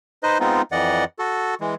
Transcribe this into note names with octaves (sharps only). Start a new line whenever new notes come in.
D#4 B4 C5 D#5
G#3 B3 C4 D#4 F4
F2 E3 D5 D#5 F#5
F#4 A4
E3 G#3